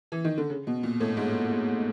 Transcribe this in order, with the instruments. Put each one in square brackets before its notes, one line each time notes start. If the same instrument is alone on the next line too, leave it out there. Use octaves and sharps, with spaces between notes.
[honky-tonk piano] E3
D#3
D3
C#3
B2
A#2
A2
G#2